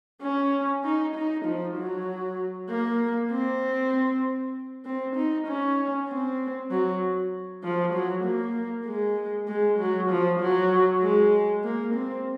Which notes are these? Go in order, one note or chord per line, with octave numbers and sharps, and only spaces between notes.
C#4
D#4
D#4
F3
F#3
A#3
C4
C4
D#4
C#4
C4
F#3
F3
F#3
A#3
G#3
G#3
F#3
F3
F#3
G#3
A#3
C4